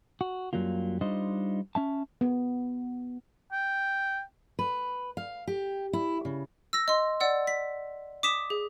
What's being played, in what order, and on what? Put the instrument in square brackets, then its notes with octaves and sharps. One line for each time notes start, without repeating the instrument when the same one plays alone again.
[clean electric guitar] F#4
F#2 F#3 G3 A#3 F4
G3 D4 D#4 F4 C5 D#5
C#4 E5 A5
[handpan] B3
[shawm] G5
[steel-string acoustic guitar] B4
F5
G4
E4
C#3
[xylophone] E6 A#6
D#5 C6
D5 F#5 E6
B6
D6 D#6 B6 E7
G#4